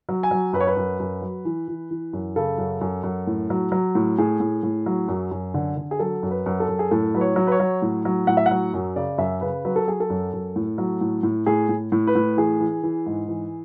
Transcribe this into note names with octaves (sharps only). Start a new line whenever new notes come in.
F#3
G#5
F#3
F#2 B4
C#5
B4
F#2
F#2
F#3
E3
E3
E3
F#2
C#3 A4
F#2
F#2
F#2
A2
F#3
F#3
A2
A2 G#4
A2
A2
F#3
F#2
F#2
D3
D3
G#4
F#3 A4
F#2
B4
F#2
A4
F#2
G#4
A2 A4
F#3 B4
C#5
F#3
B4
C#5
F#3
A2
F#3
A2 F#5
E5
F#5
F#3
F#2
C#3 D5
F#2 E5
C#3 B4
F#3 B4
A4
F#3 G#4
A4
F#2
F#2
A2
F#3
A2
A2
A2 G#4
A2
A2
B4
A2
E3 G#4
E3
E3
G#2
E3